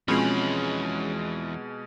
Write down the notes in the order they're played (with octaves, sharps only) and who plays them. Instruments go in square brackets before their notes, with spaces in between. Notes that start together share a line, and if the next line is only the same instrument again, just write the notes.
[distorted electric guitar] E2 B5 [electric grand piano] B2 G#3 [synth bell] F3 C4 F4 [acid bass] C#4